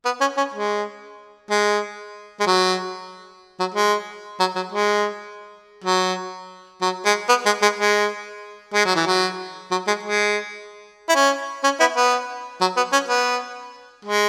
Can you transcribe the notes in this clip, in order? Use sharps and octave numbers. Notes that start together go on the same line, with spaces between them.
B3
C#4
C#4
G#3
G#3
G#3
F#3
F#3
G#3
F#3
F#3
G#3
F#3
F#3
G#3
B3
G#3
G#3
G#3
G#3
F#3
E3
F#3
F#3
G#3
G#3
E4
C#4
C#4
B3 E4
B3
F#3
B3
C#4
B3
G#3